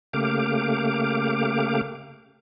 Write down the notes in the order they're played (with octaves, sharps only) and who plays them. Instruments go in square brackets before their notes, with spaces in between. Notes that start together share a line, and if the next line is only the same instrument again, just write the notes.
[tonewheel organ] C#3 A3 A#3 G4 F5 D6